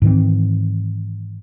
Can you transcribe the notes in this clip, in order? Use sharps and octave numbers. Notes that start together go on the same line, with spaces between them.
G#2 D#3 E3 C4